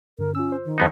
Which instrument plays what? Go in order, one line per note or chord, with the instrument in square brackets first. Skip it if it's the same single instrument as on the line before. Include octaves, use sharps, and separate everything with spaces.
[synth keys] G2 D3 [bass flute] A#4
[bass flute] C#4 [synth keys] F4 E6
[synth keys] C5
[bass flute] D#3
[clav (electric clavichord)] F2 B3 D#4